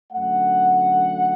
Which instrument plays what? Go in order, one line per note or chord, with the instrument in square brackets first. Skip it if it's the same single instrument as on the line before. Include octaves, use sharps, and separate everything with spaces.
[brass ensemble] F#2 D3 A3 F#5